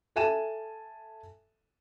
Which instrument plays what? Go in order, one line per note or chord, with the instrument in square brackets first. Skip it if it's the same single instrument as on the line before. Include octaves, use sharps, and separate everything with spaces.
[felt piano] A4 E5 G#5 A5 D#7 E7